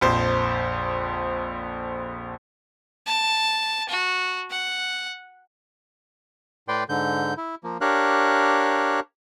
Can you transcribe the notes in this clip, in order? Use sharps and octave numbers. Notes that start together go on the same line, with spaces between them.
A#1 F2 C5
A5
F#4
F#5
A2 B4 D5 G5 C6
G#2 D3 G6
E4
F3 A#3
D4 G4 A#4 C#5 F5 F#6